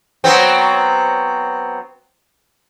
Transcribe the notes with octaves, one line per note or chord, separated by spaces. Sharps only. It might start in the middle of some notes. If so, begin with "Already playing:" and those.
F#3 B3 C4